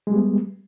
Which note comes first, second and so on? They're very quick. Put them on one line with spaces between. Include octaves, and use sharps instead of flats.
G#3 G3 B3